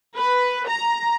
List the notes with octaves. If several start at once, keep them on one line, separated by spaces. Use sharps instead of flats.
B4
A#5